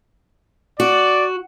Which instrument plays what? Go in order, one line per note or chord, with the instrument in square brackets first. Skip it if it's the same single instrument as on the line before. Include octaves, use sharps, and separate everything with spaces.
[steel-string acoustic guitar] F#4 [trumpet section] D5